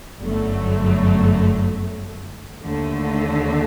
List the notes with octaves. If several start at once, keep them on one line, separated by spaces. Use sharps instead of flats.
G1 F#2 F#3 A3
D#2 D3 A3